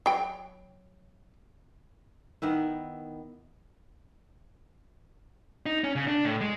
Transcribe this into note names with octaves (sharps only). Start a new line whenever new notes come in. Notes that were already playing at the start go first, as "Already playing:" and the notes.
F#3 G5
D#3 B3 E4
D#4
C#4
C#3
D4
A2
G#3